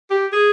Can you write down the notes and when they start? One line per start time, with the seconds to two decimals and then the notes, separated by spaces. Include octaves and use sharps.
0.10 G4
0.32 G#4